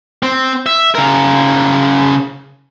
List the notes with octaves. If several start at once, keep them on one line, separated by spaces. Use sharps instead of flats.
C4
E5
C#3 A#4